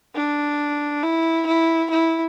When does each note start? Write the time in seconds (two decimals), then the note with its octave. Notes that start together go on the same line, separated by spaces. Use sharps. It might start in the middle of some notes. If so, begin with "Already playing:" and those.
0.15 D4
1.03 E4
1.47 E4
1.90 E4